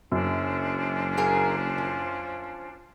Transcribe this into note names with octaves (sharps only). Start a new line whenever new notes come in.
F#1 F#2 C#4 D4 C5
A#3 G#4 A#4
F3